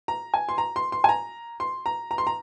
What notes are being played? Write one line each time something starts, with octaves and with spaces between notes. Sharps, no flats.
A#5
G#5
C6
A#5
C6
C6
G#5
A#5
C6
A#5
A#5
C6
A#5